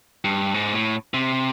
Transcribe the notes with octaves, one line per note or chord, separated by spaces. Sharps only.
G2
G#2
A2
C3